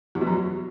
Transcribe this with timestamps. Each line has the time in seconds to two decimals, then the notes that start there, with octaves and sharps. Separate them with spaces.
0.15 E2
0.21 B2
0.27 F#2
0.32 F#3